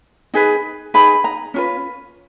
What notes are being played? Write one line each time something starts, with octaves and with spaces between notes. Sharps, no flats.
D#4 G#4 B4
D#4 G#4 B4 B5
A#5
C#4 F4 B4